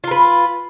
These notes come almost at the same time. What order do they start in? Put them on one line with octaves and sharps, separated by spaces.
F4 A#4 B4